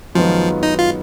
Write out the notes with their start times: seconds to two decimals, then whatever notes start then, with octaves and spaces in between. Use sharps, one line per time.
0.15 F#2 D#3 F3 G#3 B3 F4
0.63 D#4
0.79 F4